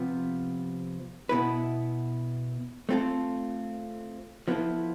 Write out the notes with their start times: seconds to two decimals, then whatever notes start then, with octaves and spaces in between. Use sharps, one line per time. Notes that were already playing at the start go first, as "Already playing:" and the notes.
Already playing: C3 F3 B3
1.29 B2 B3 E4 B4
2.89 A3 C4 F4 A4
4.48 F3 B3 E4 A4